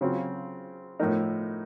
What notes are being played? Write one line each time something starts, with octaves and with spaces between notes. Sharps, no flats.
C#3 F#3 C4 F4
A2 F3 A3 D#4 A#4